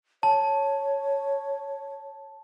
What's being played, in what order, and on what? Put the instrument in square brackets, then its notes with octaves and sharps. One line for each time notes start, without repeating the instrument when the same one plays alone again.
[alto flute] C#5 [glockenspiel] A5